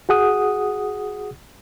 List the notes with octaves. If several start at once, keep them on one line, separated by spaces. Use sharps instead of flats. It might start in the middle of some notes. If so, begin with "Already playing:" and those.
F#4 G#4 F#5 D#6